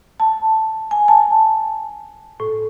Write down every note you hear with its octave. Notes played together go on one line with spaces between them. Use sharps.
A5
G#5
A5
A2